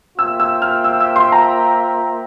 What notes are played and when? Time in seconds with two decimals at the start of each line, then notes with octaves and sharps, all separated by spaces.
0.18 A#3 F4 C5 E5 G5 E6
0.40 E6
0.62 F6
0.84 E6
1.00 E6
1.16 C6
1.32 A#5